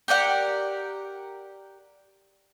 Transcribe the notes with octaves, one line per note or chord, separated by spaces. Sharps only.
G4 A#4 D5 F#5